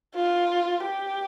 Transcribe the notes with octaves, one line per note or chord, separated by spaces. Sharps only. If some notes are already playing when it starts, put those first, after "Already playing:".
F4
G4